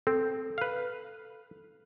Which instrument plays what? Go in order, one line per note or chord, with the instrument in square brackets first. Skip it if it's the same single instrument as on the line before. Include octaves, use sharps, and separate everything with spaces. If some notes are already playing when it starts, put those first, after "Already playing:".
[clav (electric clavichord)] C4 [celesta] A4
[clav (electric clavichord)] B4 F5